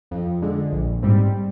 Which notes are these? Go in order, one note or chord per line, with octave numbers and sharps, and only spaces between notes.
F2
D3 G#3
A#1
G#2 G3 C4